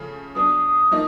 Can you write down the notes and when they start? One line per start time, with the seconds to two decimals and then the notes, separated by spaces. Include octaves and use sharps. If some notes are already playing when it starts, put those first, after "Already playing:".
Already playing: C#3 F3 A3
0.35 F#3 B3 D4 D#6
0.91 F3 A#3 D#4